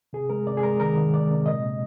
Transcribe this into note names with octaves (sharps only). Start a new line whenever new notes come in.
C3 G#4
G#3 A#4
C3 D5
G#4
G#3 A#4
D#3 A#4
D#3
G#3 D5
C3
A#2 D#5
A#2